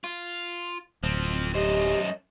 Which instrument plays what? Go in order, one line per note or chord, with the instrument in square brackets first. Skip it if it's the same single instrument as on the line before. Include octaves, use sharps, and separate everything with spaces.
[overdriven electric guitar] F4
[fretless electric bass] D1 [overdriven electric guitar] F3 C4
[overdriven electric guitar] F#2 C5 [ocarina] G4 [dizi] D#5